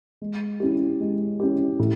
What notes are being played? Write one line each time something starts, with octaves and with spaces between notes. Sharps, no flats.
G#3
C#4 E4 G4
G#3
C#4 E4 G4
A2